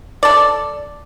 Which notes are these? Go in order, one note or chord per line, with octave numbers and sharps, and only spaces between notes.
A4 D5